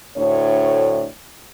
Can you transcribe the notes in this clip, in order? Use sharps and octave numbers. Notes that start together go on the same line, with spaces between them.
D2 A2 D4 C#5